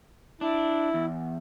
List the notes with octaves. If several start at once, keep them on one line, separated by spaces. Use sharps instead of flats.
D4 E4
E2